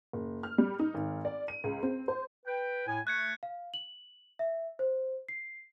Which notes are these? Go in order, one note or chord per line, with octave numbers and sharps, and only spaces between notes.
F#1
F6
G3
D#4
G#1
D5
D#7
C#2
C4
C5
B4 G5
A2 G#5
A3 F#6 G#6 C#7
F5
F#7
E5
C5
C7